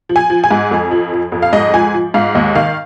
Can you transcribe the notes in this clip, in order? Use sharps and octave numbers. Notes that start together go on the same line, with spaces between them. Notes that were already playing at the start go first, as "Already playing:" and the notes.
F3
G#5
F3
G#5
G#2
F2
F3
F3
F2
F5
G#2 D#5
F3 G#5
F3
G#2 F5
D#2 D#5
D#3 F5